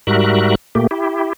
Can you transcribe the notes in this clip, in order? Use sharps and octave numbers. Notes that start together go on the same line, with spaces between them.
G#2 G3 F#4 A#4 E5 F#6
A#2 A3 A#3 G4
E4 G4